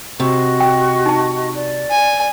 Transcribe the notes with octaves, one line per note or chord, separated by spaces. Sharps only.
C3 F#4 D#5 C#6
G5
D#4 A5
D5
G#5